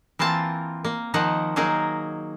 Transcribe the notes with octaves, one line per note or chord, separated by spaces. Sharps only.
E3 A#3 C4 F4 A5
A#3
D#3 F3 A#3 D#4 F#5
F#3 A#3 D#4 G#4 A#4